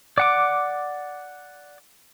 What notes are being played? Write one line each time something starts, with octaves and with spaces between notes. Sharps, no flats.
D5 F#5 D6